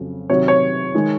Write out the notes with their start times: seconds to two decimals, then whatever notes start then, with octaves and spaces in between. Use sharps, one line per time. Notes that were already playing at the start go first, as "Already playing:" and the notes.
Already playing: F2 C#3 F#3
0.30 C3 D#3 F#3 C#5
0.48 C#5
0.95 D#3 G#3